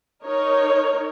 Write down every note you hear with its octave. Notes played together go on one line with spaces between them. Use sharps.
D#4 A#4 C#5